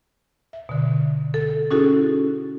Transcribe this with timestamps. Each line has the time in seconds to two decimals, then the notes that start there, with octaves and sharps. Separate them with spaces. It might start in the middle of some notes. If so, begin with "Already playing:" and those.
0.53 E5
0.69 B2 D3
1.34 A4
1.71 C#4 D#4 E4 F#4 G#4 A4